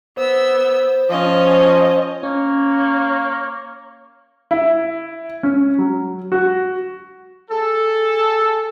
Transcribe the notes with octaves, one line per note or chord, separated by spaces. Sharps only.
B3 C5 E6
F3 C#4 D#5
A#3 C#4 C#5
E4
C#4
F#3
F#4
G#4 A4